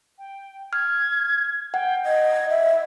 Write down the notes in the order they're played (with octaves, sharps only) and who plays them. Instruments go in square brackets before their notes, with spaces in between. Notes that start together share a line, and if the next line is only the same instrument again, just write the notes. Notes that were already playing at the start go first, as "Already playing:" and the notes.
[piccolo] G5
[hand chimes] F6 [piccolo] G#6
[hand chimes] F#5 [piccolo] G5
[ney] D#5 [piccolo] G#6
[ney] E5